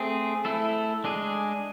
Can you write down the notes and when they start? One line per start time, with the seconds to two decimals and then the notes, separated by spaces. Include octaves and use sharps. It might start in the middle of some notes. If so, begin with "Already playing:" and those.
Already playing: A3 C4 G#4
0.45 A3 E4 A4
1.04 G#3 D4 G#4